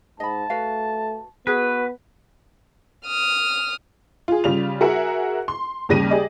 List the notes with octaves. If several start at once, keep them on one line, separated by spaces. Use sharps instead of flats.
G#2 D#5 A5 B5
A3 F#4 B4 F5
B3 F#4 G#4 B4
D#6 F6
F4 G#4
C#3 G3 F4 F7
F#4 G#4 A#4 E5 F#5
C6
D#2 C#3 G3 A#6 D#7
G4 G#4 D5 D#5